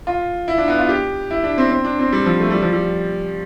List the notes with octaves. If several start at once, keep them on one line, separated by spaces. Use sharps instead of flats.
F4
E4
D4
B3
F4
G4
E4
D4
C4
C4
D4
C4
G3
F3
A3
G3
F3
G3